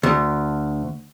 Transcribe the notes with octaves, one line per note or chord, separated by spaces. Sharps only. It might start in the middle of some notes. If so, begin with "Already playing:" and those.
D2